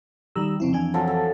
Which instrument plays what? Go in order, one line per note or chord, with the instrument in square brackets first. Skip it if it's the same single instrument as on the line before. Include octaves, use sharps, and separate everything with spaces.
[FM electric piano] D#3 A#5 E6 [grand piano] G3
[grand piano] F2 [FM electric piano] C#3 C4 E4
[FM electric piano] E3 D4 G#5
[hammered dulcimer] F3 F#3 A4
A4